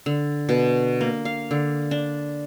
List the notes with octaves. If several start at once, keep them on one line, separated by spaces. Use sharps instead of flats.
D3
B2
A#3
F5
D3
D4